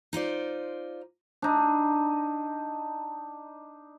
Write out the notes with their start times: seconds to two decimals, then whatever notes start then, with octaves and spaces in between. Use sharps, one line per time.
0.13 D#4 F4 C5 D5
1.42 D4 D#4